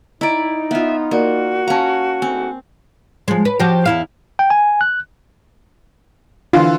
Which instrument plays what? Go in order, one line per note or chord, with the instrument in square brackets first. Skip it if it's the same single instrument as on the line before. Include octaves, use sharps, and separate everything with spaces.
[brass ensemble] D#4 [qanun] E4 D5 [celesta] D#5 A#5 D7
[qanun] B3 F4 [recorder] E5
[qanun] A#3 [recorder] F#4 [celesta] A#4 D5
[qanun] C#4 A#5 [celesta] F5 A5
[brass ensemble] D2 G#2 [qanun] C4 [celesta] G#5
[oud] F3 G#3
B4
F3 F#4 G4
E2 E4 F5
[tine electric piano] G5
G#5
F#6
[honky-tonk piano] D3 E3 [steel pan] F4